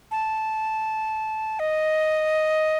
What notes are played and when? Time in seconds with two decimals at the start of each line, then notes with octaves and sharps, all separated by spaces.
0.11 A5
1.59 D#5